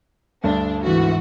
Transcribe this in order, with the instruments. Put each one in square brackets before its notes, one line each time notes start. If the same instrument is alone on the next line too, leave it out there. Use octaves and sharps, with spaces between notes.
[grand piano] D2 G2 [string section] D4
[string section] G#2 E3 F#4